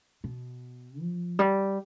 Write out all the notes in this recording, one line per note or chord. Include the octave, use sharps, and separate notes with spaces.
B2
F3
G3